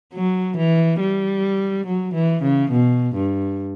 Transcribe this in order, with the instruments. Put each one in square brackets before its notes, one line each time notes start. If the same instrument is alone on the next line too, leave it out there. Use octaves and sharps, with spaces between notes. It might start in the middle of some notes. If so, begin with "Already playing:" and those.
[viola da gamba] F#3
E3
G3
F#3
E3
C#3
B2
G2